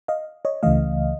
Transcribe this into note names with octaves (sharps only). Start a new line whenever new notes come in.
D#5 F5
C#5 D#5
C#2 C#3 E3 A3 D#5 F5